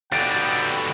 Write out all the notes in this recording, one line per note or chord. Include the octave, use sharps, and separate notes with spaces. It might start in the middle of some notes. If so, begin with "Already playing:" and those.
D#2 B2 D3 G5 A6 D7